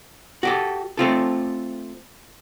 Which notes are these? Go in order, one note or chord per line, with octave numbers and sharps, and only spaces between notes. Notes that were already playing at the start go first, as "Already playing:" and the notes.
F#4 G4 A4
A3 C4 F4 A4